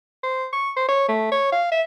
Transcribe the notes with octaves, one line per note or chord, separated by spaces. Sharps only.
C5
C#6
C5
C#5
A3
C#5
F5
E5